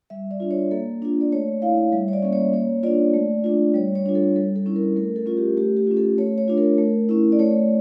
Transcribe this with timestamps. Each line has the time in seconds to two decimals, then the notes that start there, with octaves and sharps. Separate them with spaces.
0.10 G3 E5
0.31 D5
0.40 D4 F4
0.51 C#5
0.71 A#3 A4
1.02 D4 F4
1.21 D5
1.32 A3 C#5
1.62 E4 F5
1.77 F5
1.92 G3 E5
2.08 C#5
2.13 D5
2.23 A#3 C#4
2.33 C#5
2.53 A#3 C#5
2.83 D4 F4 D5
3.14 A3
3.44 D4 F4
3.74 G3 C#5
3.95 C#5
4.06 D4 F4
4.15 A4
4.36 G3 A4
4.56 A4
4.66 C#4 E4
4.76 A#4
4.96 A3 A#4
5.16 A4
5.26 C#4 F4
5.37 G4
5.57 A3 G4
5.77 G4
5.87 C#4 F4
5.97 A4
6.18 A3 C#5
6.38 C#5
6.48 D4 F4
6.58 A#4
6.78 A3
7.09 C#4 E4
7.32 D5
7.39 A3 C#5